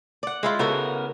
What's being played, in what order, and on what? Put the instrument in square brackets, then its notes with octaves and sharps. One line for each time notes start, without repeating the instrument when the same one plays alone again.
[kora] D5 F#5
G#3 E4 F4
[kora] C#3 F#4 A4 [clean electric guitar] B3 A#4